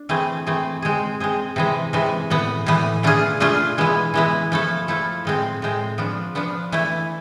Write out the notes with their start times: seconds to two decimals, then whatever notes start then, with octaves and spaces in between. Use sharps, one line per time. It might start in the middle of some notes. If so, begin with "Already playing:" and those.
Already playing: D4
0.09 E3 A3 C4 G#4
0.47 E3 A3 C4 G#4
0.82 G#3 C4 G#4
1.20 G#3 C4 G#4
1.56 C3 E3 G#3
1.93 C3 E3 G#3
2.30 A2 E3 B3
2.66 A2 E3 B3
3.03 B2 A3 D4 F4 G#4
3.40 B2 A3 D4 F4 G#4
3.78 E3 G#3 B3 E4
4.14 E3 G#3 B3 E4
4.52 F3 A3 E4 A4
4.88 F3 A3 E4 A4
5.25 A2 G#3 C4
5.62 A2 G#3 C4
5.98 F3 B3 D4
6.35 F3 B3 D4
6.72 E3 A3 E4